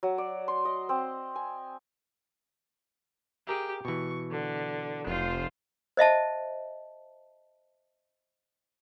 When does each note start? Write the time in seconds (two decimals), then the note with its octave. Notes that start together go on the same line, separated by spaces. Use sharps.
0.03 F#3
0.18 D5
0.48 C6
0.65 D#5
0.89 C4
1.36 G#5
3.47 G4 G#4 A#4 E5
3.85 B2 E3 C#6
4.31 D3
5.07 F1 F4 C5
5.97 C5 D#5 E5 A5